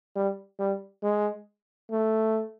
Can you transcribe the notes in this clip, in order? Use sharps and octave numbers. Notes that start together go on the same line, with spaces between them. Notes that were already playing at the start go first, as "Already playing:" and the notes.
G3
G3
G#3
A3